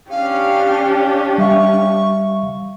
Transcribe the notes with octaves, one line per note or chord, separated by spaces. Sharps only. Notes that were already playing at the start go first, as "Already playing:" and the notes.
C#4 D4 G4 F5
G3 E5 F5 C#6